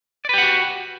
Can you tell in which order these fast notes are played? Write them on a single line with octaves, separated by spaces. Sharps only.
D5 B4 G4 F#5 F#4